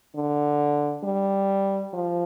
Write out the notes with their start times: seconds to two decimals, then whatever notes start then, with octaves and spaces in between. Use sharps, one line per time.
0.15 D3
1.04 G3
1.93 F3